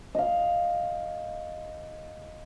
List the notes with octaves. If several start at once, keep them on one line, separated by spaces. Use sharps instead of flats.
D#5 F5